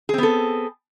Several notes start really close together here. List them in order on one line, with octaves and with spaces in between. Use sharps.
G#4 C4 B3 A4